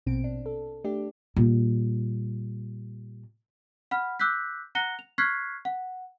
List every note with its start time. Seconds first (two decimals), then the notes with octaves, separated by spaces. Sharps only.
0.06 A#1 B2 C4 D7
0.24 D4
0.46 A4
0.84 A3 D4 G4
1.36 A#2 G3
3.91 F#5 B5 F6
4.20 D6 E6 F#6 G6 B6
4.75 F#5 A#5 F#6 A#6 C#7 G7
4.99 F7
5.18 C#6 F6 F#6 G#6 B6 C7
5.65 F#5